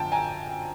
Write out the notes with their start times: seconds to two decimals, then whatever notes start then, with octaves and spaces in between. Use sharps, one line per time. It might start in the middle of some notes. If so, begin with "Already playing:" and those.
Already playing: F#2 D3 F3 G5 A5
0.12 G#5 A#5